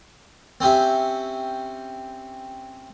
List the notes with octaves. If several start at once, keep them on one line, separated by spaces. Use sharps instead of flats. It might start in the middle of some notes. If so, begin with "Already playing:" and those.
C4 C#4 G4 E5